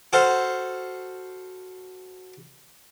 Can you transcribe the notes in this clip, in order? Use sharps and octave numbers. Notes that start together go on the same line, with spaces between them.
F#4 A4 C5 F5